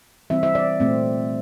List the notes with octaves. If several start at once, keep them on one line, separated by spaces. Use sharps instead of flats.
E3 G3 C4 E5
E5
D5
A#2 A3 C4